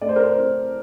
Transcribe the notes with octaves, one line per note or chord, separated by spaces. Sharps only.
A3 D5
C5
A#4
C5
C4